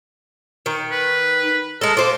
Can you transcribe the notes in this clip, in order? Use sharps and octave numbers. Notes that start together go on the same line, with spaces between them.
D#3
B4
G#3 A4 A#4
F4 C5 D6